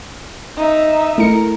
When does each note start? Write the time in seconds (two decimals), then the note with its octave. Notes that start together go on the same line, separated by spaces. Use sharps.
0.56 D#4 E5
1.18 A3 E4 A#4 C#7